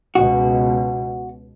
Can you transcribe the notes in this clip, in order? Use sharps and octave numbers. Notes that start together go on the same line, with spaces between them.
C#2 B2 F#4